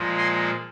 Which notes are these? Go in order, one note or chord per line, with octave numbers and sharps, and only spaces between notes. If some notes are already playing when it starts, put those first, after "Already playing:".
Already playing: A#2 F3 G#3
G#5 C6